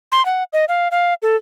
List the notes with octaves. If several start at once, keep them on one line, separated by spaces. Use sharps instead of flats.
C6
F#5
D#5
F5
F5
A4